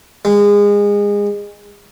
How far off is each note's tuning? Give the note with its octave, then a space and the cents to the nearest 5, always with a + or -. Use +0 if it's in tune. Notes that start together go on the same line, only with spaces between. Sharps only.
G#3 -25